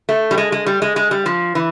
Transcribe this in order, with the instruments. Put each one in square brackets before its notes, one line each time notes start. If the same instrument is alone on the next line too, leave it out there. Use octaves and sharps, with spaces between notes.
[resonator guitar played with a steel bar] A3
G3
G#3
G#3
G3
G#3
G#3
G3
F3
E3